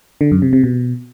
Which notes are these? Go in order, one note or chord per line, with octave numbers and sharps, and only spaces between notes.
D3
F#2
C3
C3
B2